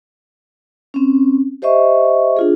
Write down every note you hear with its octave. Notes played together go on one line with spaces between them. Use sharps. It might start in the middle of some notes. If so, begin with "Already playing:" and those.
C4 C#4
G4 C5 D#5 E5 C#6
D4 F4 G#4